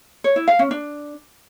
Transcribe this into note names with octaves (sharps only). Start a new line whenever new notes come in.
C#5
E4
F5
C#4
D4